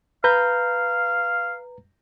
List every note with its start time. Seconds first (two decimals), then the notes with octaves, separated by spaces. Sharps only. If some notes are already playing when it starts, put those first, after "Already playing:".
0.24 B4 F5 A#5 G6